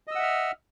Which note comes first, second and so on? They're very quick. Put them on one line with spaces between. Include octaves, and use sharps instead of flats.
D#5 E6 F#5 E5 F6